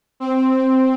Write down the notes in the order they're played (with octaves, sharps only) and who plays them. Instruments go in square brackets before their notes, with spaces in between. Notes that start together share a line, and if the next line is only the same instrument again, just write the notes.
[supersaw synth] C4